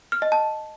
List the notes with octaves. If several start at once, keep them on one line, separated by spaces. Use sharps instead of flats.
F6
D#5
A5